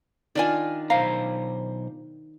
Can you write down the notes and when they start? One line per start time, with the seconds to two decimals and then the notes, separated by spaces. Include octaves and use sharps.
0.35 D#3 D4 F4 D5 G#5
0.90 B1 C5 F5 A#5